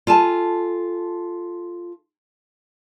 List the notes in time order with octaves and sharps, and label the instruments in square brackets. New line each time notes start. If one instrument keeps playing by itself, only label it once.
[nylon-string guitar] F4 A4 G#5 A5